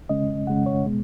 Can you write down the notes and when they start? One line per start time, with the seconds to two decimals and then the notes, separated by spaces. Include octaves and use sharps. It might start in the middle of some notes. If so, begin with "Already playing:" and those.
0.09 C#3 G#3 C#4 D#5
0.47 C#3 G#3 C#4 F#5
0.66 C#5
0.84 B2 G#3 B3